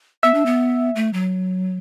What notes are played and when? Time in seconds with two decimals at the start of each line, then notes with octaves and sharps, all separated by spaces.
0.23 B3 E5
0.34 D4
0.46 B3
0.96 A3
1.13 F#3